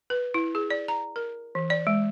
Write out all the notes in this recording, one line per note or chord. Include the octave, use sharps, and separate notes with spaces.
B4
E4
G#4
D5
A#5
A#4
E3
D5
G#3